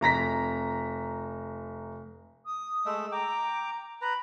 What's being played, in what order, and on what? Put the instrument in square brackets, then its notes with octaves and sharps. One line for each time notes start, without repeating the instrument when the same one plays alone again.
[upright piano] F1 A#5 A#6 B6
[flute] D#6
[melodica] G#3 A3 E5
[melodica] G5 D6 [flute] A#5
[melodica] B4 A#5 [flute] B5